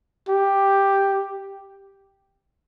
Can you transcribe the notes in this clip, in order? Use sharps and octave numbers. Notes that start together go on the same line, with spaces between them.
G4